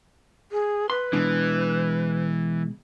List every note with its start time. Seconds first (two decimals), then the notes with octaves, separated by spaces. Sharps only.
0.52 G#4
0.90 B4 C6
1.13 B2 E3 G#3 D4